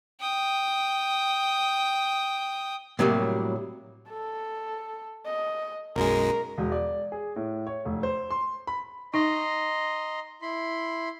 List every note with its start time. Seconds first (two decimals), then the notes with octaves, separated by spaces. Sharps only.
0.21 G5 D#6
2.99 A2 C3 F#3 G3 A3 A#3
4.09 A4
5.25 D#5
5.96 B1 F#2 G#3 A#4
6.58 E1
6.72 D5
7.12 G#4
7.36 A2
7.67 C#5
7.85 F1
8.03 C5
8.31 C6
8.67 B5
9.14 D#4 D#5 A#5 C6
10.42 E4 B5 C6